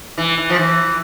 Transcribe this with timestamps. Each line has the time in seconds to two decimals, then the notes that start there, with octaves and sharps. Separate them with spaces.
0.18 E3
0.38 E3
0.50 F3
0.59 E3